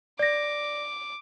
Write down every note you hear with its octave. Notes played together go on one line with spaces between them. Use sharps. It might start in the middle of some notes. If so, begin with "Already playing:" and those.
D5 D6 A#6